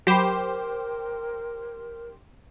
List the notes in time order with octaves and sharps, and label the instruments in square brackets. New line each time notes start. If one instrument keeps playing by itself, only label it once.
[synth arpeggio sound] F#3 B5 [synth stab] G4 C5 [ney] A#4